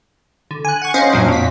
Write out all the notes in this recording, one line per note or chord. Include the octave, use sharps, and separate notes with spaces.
D3
G#5 F#6
F#5 C#6
C#4 C5 D#5 F5
F#2 A#2 F#3 D4
F2 B6